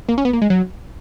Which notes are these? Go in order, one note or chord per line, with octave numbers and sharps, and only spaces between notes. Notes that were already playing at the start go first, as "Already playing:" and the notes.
A#3
C#4
B3
A#3
G#3
F#3